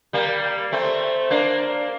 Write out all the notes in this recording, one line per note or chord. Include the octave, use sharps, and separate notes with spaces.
G3 A#3
A3 C4
A#3 D4